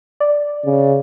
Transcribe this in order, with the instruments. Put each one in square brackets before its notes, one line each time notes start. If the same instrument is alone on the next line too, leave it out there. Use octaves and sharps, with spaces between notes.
[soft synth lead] D5
[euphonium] C#3